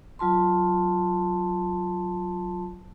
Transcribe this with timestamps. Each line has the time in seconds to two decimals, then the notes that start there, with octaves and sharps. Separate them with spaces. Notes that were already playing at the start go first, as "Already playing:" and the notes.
0.19 F#3 F4 A5 C6